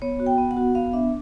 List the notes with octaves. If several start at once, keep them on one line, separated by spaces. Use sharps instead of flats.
B3 C#5
F#4
G5
B3
F#5
F#4
B3 F5
D4 E5